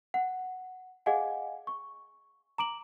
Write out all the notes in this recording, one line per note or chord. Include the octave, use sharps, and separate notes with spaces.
F#5
G#4 D#5 F5 F#5 G#5
C#6
A#5 D6 D7 F#7